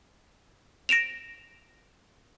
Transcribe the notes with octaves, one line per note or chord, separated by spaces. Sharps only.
A#6 D7 E7 F7